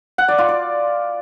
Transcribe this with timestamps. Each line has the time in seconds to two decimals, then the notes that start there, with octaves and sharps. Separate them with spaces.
0.18 F#5
0.28 D5
0.38 F4
0.49 D5